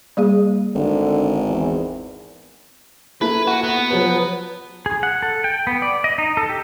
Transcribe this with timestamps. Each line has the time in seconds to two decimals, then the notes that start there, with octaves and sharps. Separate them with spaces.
0.17 G3 A#3 G#4
0.75 G#1 D3
1.48 E2
3.21 A#3 E4 A4 B4
3.47 F#4
3.64 B3
3.91 F3 F#3 B4
4.86 G#4
5.03 F#5
5.23 A4
5.44 G5
5.67 B3
5.82 D5
6.04 D#5
6.18 D#4
6.37 A4
6.49 G4